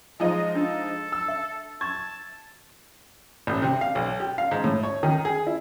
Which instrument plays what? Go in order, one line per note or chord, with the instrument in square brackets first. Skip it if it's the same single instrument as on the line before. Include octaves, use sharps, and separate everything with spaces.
[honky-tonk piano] F3 G#3 D#4 [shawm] D#5
[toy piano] D4 [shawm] A4
[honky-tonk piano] E6
[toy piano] E5
[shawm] A5 [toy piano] C#6 [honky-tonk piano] G#6
[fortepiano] A1
C3
F5
B1
G4
F5
G#2
A2
C#5
D#3
G#4
E4